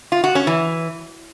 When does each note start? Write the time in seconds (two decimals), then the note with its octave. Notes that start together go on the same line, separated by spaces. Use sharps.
0.12 F4
0.24 F#4
0.35 C#4
0.47 E3